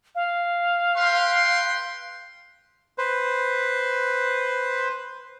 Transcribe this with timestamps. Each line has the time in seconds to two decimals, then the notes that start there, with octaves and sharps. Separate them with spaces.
0.15 F5
0.96 B4 G5 C6
2.98 B4 C5